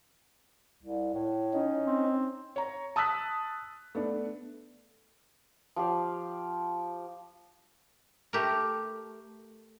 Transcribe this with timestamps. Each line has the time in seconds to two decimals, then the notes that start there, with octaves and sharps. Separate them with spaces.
0.83 C2
1.14 A2
1.53 C#4 D#4
1.87 C4
2.56 C#5 A#5
2.96 A5 D#6 E6 F#6 B6
3.95 A3 B3 D4
5.76 F3 G4 F5
8.33 A3 G4 A#4